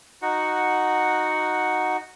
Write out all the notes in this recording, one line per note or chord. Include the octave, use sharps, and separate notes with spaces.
D#4 F#4 F#5